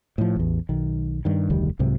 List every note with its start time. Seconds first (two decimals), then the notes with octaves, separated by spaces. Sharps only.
0.18 A2 F3
0.36 A1 E2
0.69 B1 D#3
1.25 G2 D#3
1.50 F1 D2 D#3 G3
1.79 C2 G#2 C3 F#3